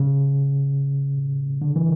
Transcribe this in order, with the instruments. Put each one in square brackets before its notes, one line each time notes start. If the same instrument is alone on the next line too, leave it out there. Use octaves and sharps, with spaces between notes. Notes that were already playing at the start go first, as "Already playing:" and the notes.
Already playing: [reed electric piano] C#3
D3
E3